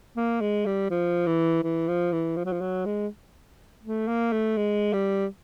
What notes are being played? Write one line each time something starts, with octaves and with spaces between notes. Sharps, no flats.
A#3
G#3
G3
F3
E3
E3
F3
E3
F3
F#3
F3
F#3
G#3
A3
A#3
A3
G#3
G3